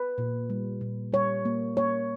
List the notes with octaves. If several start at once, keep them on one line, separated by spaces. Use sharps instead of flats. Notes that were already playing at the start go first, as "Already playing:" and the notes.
Already playing: B4
A#2
G3
A#2
G3 C#5
A#3
A#3 C#5